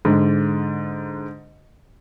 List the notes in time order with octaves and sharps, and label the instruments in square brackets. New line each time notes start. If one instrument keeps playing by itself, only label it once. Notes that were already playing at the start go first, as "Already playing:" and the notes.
[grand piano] G#2 D3